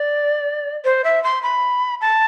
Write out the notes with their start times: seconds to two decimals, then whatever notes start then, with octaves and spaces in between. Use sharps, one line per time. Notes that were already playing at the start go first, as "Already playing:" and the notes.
Already playing: D5
0.85 C5
1.04 E5
1.24 C6
1.43 B5
2.01 A5